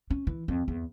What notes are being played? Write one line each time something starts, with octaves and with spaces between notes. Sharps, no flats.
C#4
E3
F2
E2